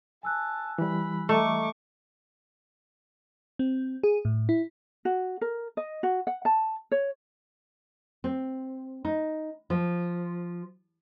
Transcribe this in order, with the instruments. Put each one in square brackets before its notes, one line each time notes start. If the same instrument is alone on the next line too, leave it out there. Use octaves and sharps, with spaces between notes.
[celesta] G#5 E6 F#6 [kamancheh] A5
[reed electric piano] E3 G3 [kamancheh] B5
[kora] A3 [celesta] D#5 E5 A#5 [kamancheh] C#6 D6
[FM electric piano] C4
G#4
A2
E4
[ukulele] F#4
A#4
D#5
F#4
F#5
A5
C#5
[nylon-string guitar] C4
D#4
F3